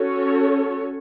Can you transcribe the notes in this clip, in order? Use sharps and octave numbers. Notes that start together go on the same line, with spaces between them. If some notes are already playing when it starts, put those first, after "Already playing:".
Already playing: C#4 F#4 A4 C#5